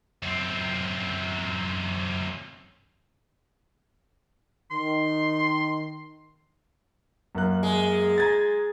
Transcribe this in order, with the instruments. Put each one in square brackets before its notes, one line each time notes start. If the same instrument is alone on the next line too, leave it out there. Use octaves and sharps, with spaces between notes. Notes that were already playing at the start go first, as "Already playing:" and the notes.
[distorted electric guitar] F#2 C4
[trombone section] D#3 [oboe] C6
[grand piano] F#2 A#3 F#6
[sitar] G#3
[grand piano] A#5 G#6 A6